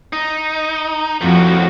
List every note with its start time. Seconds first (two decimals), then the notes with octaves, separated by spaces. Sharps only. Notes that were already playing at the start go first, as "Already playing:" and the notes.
0.13 D#4
1.21 F2 A2 F3 F#4